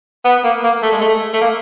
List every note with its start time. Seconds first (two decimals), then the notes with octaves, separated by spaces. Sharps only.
0.25 B3
0.44 A#3
0.64 A#3
0.82 A3
0.92 G#3
1.01 A3
1.33 A3
1.41 A#3